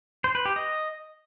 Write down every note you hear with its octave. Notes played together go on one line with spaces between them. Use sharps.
C5
B4
G4
D#5